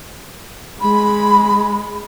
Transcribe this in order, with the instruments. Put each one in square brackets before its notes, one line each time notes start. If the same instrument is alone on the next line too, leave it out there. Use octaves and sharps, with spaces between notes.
[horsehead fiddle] G#3 [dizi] B5